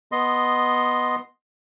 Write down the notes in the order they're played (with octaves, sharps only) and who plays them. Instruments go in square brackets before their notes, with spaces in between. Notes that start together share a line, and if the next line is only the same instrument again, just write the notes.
[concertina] B3 D#5 C6